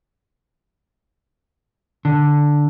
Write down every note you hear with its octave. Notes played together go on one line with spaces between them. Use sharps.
D3